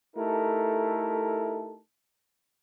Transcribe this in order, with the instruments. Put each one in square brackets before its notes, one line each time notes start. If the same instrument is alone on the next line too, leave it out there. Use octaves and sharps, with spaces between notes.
[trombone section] A3 D#4 E4 G4 A4 A#4